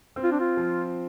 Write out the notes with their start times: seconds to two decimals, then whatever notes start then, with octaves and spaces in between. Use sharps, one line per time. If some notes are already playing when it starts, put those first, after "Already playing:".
0.16 C4
0.24 F4
0.32 D4
0.40 F4
0.57 F3